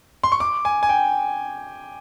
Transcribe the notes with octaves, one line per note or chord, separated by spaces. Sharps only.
C6
C#6
D6
G#5
G#5
G5